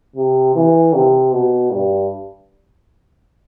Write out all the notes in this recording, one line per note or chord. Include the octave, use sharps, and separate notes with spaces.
C3
E3
C3
B2
G2